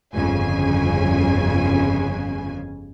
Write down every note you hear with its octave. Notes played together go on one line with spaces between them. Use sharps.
G1 F2 C#3 G#5